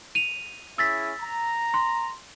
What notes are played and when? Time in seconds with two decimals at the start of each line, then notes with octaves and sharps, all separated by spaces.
0.15 D#7 F7
0.78 C#4 E4 G#4 E6 A6 B6
1.21 A#5
1.74 C6